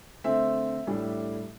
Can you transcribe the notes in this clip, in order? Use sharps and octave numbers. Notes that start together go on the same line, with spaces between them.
D3 A3 C4 E5
A2 G3 D4